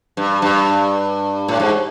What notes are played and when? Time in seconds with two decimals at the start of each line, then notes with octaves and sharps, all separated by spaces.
0.17 G2
0.42 G2
1.48 A2
1.60 G#2